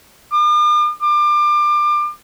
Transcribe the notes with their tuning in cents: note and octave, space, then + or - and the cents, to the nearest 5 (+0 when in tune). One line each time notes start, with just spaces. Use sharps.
D6 +45
D6 +30